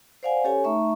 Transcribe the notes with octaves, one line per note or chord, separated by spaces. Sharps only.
C5 D5 F5 F#5 G#5
C#4 G4 A4 C#5 G#5
A3 D#4 E5 A#5 C#6